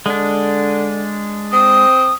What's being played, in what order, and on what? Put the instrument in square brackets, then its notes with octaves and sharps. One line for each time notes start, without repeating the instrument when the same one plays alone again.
[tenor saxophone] D3 [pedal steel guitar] G#3 D4
[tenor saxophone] C4 [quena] D#6